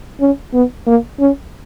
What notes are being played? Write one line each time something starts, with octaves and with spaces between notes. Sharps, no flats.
C#4
B3
A#3
C#4